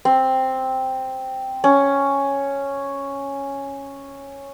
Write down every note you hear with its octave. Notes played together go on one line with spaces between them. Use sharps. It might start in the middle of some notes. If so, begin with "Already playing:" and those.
C4
C#4